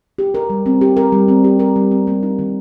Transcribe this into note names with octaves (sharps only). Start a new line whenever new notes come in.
G4
A#4
G3
C4
G4
A#4
G3
C4
G4
A#4
G3
C4
A#3
D#4
D#3